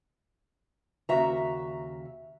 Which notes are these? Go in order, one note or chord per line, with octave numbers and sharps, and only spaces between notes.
D#2 C#3 F#4 E5 A#5